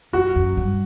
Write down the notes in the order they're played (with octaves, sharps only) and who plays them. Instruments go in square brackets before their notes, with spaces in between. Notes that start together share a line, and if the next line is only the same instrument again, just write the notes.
[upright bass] F#2 [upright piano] F#4
[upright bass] F#2
G2